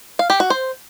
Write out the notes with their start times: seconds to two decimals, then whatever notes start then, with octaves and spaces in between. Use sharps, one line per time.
0.19 F5
0.30 G4
0.40 F#4
0.50 C5